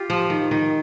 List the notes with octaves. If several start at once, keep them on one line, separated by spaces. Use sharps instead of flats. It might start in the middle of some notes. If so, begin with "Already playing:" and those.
Already playing: F4 G4
F3
D#3
D#3